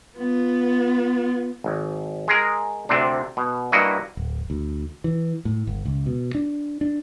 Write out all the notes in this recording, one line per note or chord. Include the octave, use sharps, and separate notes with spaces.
B3 F4
G#1
G#3 G#4 A#4
D2 C3 C4 D4
B2
G2 A#3 E4 F#4 D#5
D1
D2
E3
A2
G1
C#2
B2
D4
D4